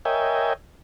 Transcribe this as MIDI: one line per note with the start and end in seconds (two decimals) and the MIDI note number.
0.05 0.53 70
0.05 0.53 73
0.05 0.53 75
0.05 0.53 76
0.05 0.53 79
0.05 0.53 80